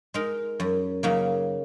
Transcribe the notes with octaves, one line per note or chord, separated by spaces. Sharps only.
G#3 D#4 A#4
F#2
C#3 F#3 A#3 D#4